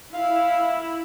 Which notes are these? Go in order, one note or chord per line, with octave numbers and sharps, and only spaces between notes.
E4 F5